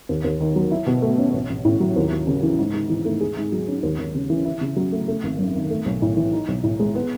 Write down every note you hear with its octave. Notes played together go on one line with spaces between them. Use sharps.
D#2
D#2
D#3
F#3
E4
B2
A3
C#4
A1
A1
A2
F#3
D#2
D#2
C#3
E3
G#2
G#2
E3
A3
G#4
G#2
F#3
C#4
D#2
D#2
C#3
E3
E4
C#3
F#3
A3
A3
G#1
F#2
D#3
A3
B1
A2
E3
D#4
B1
A2
G#3
B3